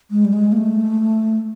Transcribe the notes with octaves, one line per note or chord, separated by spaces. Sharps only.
G#3
G3
G#3
A#3
A3